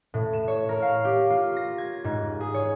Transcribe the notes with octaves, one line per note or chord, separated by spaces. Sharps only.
A2
E7
C#5
A#4
F5
G4
F4
A#6
G#6
G#2
G#4
C#5